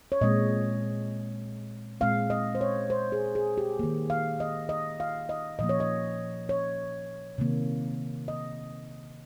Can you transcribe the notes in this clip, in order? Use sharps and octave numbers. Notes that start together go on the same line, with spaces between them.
C#5
A#2 G#3 C4 D#5
A#2 G#3 C4 F5
D#5
C5
C#5
C5
G#4
G#4
G4
D#3 A#3
F5
D#5
D#5
F5
D#5
A#2 F3 A#3 D#5
C#5
D#5
C#5
C3 D#3 A#3
D#5